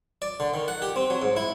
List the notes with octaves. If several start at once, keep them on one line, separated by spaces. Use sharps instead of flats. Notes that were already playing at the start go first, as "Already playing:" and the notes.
D5
D3
D#3
F#5
G4
C4
F#3
G#2
E4